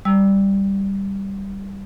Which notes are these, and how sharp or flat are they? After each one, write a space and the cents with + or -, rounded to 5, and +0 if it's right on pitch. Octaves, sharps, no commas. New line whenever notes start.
G3 +0 E6 -5